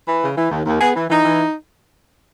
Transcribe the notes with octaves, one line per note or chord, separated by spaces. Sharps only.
E3
C#3
E3
D#2
D#2
B3 G#4
E3
E3 D#4
E3